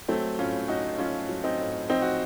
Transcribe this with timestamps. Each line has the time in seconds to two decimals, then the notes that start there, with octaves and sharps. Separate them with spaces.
0.08 F#3 A3 C4
0.39 A2 C#4 F4
0.68 A2 D#4 F#4
0.98 F#3 C#4 F4
1.29 F#3
1.44 C4 D#4
1.59 A2
1.89 F3 C4 D#4
2.02 F#4